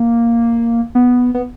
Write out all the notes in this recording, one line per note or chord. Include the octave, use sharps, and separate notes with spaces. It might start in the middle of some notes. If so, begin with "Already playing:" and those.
Already playing: A#3
B3
B3